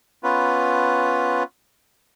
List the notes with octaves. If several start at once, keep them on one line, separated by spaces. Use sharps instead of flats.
B3 C#4 F4 B4